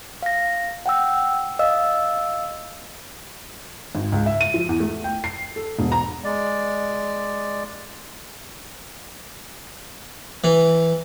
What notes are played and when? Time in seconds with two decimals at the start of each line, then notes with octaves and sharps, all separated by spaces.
0.23 F5 A#6
0.86 F#5 G5 E6
1.59 D#5 F5 E6
3.95 G#1
4.12 C#2
4.26 E5
4.41 D#7
4.54 F3
4.69 E2
4.80 A3
5.04 G5
5.24 C7
5.56 A4
5.79 E1
5.92 A#5
6.24 G#3 D5
10.44 E3